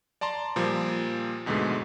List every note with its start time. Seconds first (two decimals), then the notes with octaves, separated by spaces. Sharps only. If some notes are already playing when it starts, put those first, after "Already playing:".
0.21 D5 A5 A#5 C6
0.56 A#2 F3 G3 A#3
1.46 E2 G#2 B2 D3 G#3 A3